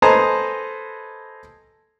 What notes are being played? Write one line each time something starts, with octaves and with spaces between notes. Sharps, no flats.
A4 B4 C5 D#5 G#5 A#5